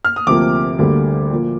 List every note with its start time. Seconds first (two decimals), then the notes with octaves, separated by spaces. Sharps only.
0.05 F6
0.16 D#6
0.27 D2 C3 F3 A#3 D6
0.78 D2 D3 G3 A#3
1.31 A#2 F3 A#3